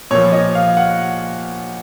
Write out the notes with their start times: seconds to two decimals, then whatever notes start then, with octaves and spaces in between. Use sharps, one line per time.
0.11 A#2 F3 C#5
0.32 D#5
0.55 F5
0.77 F#5